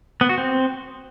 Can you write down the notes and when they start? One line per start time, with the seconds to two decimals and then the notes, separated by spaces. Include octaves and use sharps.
0.21 B3
0.29 F#4
0.38 C4